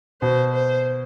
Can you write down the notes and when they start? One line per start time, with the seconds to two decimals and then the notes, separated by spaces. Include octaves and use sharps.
0.22 B2 C5
0.54 C5